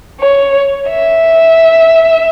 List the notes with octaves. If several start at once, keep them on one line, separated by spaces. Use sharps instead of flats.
C#5
E5